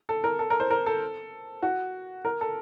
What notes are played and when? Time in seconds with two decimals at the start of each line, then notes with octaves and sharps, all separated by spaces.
0.09 A4
0.24 A#4
0.39 A4
0.50 A#4
0.60 C5
0.70 A#4
0.86 A4
1.62 F#4
2.25 A#4
2.41 A4